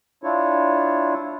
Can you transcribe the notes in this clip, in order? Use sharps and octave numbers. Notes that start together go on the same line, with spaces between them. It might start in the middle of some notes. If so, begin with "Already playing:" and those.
D4 E4 F4 C#5